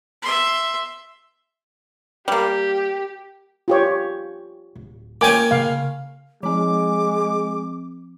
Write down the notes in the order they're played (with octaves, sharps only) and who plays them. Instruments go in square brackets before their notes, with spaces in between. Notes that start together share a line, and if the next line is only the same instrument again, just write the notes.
[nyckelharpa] E5 C6
[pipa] G3 A#3 [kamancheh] G4
[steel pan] F4 G4 C#5
[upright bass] D1
[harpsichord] A#3 C#5 [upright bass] C#4 F4 [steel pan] G5 G#5 D6
[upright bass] C#3 [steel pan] F5
[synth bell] F3 C4 [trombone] G#3 [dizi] D6